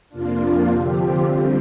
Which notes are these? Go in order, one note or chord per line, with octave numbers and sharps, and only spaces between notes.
F2 C3 A#3 D4 F4
D3 F3 C4 G4
F4
D3 G3 C4